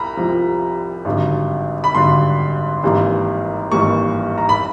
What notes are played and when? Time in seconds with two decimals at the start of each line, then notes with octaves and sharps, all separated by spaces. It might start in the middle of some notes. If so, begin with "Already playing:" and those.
Already playing: C2 A#5 B5
0.17 C2 C3 F3
1.05 G#1 G2 D3 F#3
1.84 B5
1.94 G#1 G2 D3 F#3 C6
2.83 G#1 G2 E3 G3 A#3
3.71 G#1 G2 E3 G3 A#3 C#6
4.38 A#5
4.49 B5